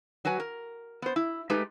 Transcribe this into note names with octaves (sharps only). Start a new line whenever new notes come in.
F#3 F#4 B4 G#5
A#4
B3 C5
E4
G#3 A3 D#4 G4 B4